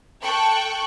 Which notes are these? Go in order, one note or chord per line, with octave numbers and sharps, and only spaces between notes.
A4 G5 C#6 F#6